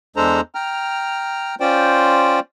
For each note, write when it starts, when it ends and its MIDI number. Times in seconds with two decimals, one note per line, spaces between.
0.16 0.41 40
0.16 0.41 56
0.16 0.41 62
0.16 0.41 69
0.16 0.41 72
0.16 0.41 82
0.55 1.55 79
0.55 1.55 82
0.55 1.55 89
1.60 2.40 61
1.60 2.40 65
1.60 2.40 72
1.60 2.40 74
1.60 2.40 79